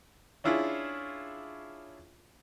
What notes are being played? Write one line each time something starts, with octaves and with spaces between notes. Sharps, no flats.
C#4 D4 E4 F4 G#4 C#5